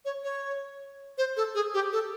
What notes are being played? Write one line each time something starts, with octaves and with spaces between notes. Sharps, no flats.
C#5
C#5
C5
A4
G#4
G4
A4